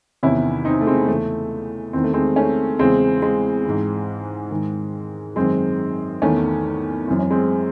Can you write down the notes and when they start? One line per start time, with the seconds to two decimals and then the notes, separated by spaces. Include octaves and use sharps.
0.23 E2 C3 D#3 C#4 E4
0.65 C4 D#4
0.81 A3
0.87 G#3 C4
1.08 E2 C#3 E3 A3
1.93 E2 D#3 C4
2.04 A3
2.14 G#3 C4
2.36 A3 C#4
2.79 E2 C#3 E3 G#3 C4
3.22 G#3 C4
3.65 G#2 E3
4.51 G#2 D#3
5.36 F#2 D#3 G#3 C4
6.22 E2 D#3 A3 C#4
7.07 F#2 E3 C4
7.19 C#4
7.31 G#3 C4